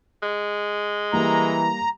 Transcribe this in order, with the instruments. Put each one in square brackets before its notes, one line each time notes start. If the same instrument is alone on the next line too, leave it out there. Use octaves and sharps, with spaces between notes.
[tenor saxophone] G#3
[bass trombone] E3 [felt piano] G3 A#3 [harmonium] A#5